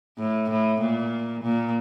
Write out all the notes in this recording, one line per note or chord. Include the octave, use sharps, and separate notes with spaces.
A2
A2
A#2
A#2